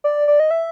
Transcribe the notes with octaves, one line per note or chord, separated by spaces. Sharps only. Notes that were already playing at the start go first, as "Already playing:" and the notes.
D5
D5
D#5
E5